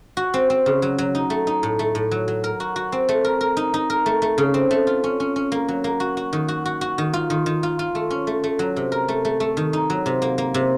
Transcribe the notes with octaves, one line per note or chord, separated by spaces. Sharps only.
F#4
C4
C4
C#3
F#3
F#3
D#4
A3
D#4
A2
A3
A2
F#3
F#3
A#4
F#4
F#4
C4
A3
A#4
A#4
D#4
D#4
A#4
A3
A3
C#3
C4
A3
F4
C#4
C#4
C#4
A#3
F#3
A#3
F#4
F#4
D#3
F#4
F#4
F#4
D#3
F4
D#3
D#3
F4
F4
A3
C#4
A3
A3
F#3
C3
A#4
A3
A3
A3
D#3
D#4
F#3
C3
A#3
A#3
C3